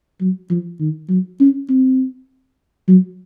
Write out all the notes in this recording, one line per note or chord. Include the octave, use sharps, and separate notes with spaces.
F#3
F3
D#3
F#3
C#4
C4
F#3